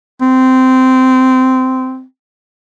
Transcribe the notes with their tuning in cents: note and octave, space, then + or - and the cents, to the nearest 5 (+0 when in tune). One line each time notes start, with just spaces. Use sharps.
C4 -15